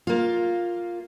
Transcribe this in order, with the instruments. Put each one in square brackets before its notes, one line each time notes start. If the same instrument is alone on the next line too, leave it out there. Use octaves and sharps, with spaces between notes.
[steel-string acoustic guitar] A#3 F4